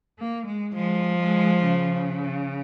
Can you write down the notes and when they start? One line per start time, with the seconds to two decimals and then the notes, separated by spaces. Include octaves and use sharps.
0.18 A#3
0.45 G#3
0.74 F3 G#3
1.18 G#3
1.61 C#3